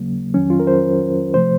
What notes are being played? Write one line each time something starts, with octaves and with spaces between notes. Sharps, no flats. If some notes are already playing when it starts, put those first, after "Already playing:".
Already playing: D#2 C#3 F#3 A#3
F2 D#3 F#3 C#4
F4
A#4
C5
C3 F3 A3 C5